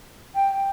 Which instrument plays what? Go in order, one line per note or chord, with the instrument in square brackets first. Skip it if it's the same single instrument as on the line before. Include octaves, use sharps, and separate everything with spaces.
[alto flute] G5